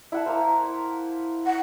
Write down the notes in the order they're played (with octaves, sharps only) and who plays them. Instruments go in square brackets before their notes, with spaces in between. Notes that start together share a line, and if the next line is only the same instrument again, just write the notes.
[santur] E4 F#5 A5
A#3 A#4 C5
[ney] F#5